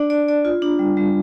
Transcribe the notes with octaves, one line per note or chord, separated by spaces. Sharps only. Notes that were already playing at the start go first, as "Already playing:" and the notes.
Already playing: D4 D5
D5
D5
F4
D4
G3
G3